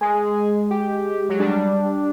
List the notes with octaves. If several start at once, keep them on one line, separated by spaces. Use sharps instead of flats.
G#3 G#4
G4
F#3
G3 D4